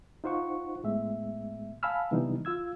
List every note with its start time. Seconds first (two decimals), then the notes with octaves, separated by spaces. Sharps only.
0.24 D#4 F4 C5 F#5 C#6
0.84 A2 G#3 B3 E5
1.83 F5 G#5 A5 B5 E6 F6
2.11 C3 E3 G3 B3 D#4
2.45 F4 F5 E6 G#6